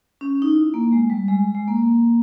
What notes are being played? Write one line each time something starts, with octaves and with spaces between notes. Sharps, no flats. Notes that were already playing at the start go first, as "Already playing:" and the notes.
C#4
D#4
E4
A#3
G#3
G3
G#3
G#3
A#3